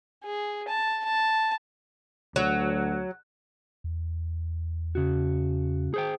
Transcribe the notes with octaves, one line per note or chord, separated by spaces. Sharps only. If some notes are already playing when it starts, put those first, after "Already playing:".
G#4
A5
A5
D2 F#3
E2
C#3 F#4
G#4 C5 G5